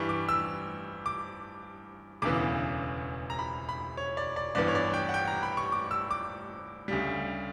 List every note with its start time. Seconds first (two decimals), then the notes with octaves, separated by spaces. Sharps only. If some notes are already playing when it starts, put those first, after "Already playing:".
Already playing: G2 E3 G3 C#6
0.09 D6
0.29 E6
1.06 D6
2.22 E1 D2 C#3 E3 B3 D6
3.30 A#5
3.39 B5
3.69 B5
3.97 C#5
4.17 D5
4.36 D5
4.55 G1 G2 E3 B3 D5
4.68 C#5
4.75 D5
4.94 G5
5.09 F#5
5.14 G5
5.27 A#5
5.43 B5
5.57 C#6
5.72 D6
5.91 E6
6.11 D6
6.88 D2 C#3 G3